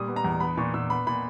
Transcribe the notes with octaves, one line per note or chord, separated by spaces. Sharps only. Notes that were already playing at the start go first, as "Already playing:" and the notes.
Already playing: A#2 G3 D#6
B3
A#5
E2
B3 B5
A#2 C#6
A#2 E6
B3 B5
A#2 B5